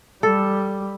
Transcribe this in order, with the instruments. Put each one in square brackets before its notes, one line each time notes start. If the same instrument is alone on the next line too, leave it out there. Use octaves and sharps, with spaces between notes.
[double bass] G3 [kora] A4